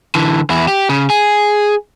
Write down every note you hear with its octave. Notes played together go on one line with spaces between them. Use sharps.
D3 E3
E2 E4
G4
C#3
G#4